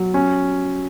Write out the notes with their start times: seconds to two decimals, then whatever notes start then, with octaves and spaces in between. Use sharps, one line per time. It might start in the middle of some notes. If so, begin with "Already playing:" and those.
Already playing: F#3
0.14 C#4